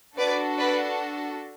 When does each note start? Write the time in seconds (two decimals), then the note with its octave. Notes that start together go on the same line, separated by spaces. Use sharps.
0.16 D4 F#4 A4 B4 D5
0.58 B4 D5